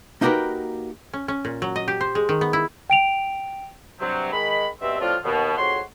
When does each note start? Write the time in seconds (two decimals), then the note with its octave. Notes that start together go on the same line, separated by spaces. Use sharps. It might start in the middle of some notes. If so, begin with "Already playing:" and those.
0.21 A#3 D#4 F#4 G4 A#4 B4
1.13 C#4
1.28 C#4
1.45 A#2
1.62 F#3
1.76 D#5
1.88 G4
2.01 C5
2.15 G#3
2.29 D#3
2.41 B3
2.53 E4
2.90 G5 D7 F7
4.01 G2 C3 F#3 C4
4.33 D#3 G#3 B5
4.81 G2 B2 C4 E5
5.01 A2 F3 G3 C4 D4 F4
5.24 D#2 B2
5.58 F2 G#2 F#4 C#5 C6